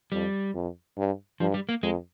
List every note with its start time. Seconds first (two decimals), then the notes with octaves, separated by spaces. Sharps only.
0.12 F2 G3
0.55 F2
0.97 G2
1.40 G2 F3
1.54 G3
1.69 A#3
1.83 F2 G#3